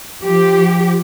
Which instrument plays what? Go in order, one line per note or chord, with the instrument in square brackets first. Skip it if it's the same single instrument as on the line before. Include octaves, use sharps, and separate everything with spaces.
[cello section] F3 G4